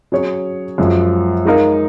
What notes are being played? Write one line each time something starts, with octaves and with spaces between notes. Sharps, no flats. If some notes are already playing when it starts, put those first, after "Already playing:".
F#3 C#4 G#4 C#5
F#2 F3 G#3
G#3 D#4 A#4 F5